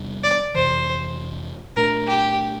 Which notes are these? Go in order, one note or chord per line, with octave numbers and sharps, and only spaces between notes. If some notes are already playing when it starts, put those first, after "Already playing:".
Already playing: E2 C3 G3 D4
D5
F2 C3 E3 C5
A#2 A3 D4 A#4
G4